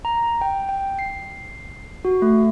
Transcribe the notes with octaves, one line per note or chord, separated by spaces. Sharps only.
A#5
G5
G5
C7
F#4
A3